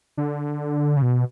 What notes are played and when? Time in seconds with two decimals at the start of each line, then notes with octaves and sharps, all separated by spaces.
0.17 D3
0.97 C#3
1.02 B2